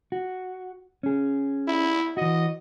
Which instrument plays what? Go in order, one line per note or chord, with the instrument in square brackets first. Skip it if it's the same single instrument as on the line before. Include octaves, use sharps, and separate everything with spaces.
[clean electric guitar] F#4
C#4 G#4
[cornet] E4
[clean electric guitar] E3 F#4 [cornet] D#5